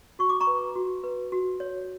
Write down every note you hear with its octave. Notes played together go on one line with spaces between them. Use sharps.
F#4 C#6
D6
A#5 C#6
B4
F#4
B4
F#4
C#5